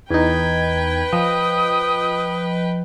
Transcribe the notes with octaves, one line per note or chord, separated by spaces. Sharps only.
E2 D#4 B4 G5 G#6
F3 D#5 D#6